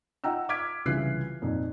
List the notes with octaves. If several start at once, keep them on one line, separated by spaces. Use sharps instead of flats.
F4 D#5 F#5 G5 A#5 E6
D6 F6 G#6 B6 D7
C2 C#3 E3 F4 F#6 C7
F2 A#2 D#4